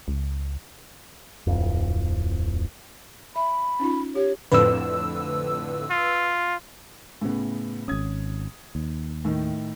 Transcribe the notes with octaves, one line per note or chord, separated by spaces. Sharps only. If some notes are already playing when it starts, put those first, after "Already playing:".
C#2
D1 G#1 F2
E5 B5
C#4 D#4 F4
G4 C#5
F2 A2 D3 B4 E6
F4
A2 C#3 B3
G#1 C#4 D#6 G#6
D#2
A2 D#3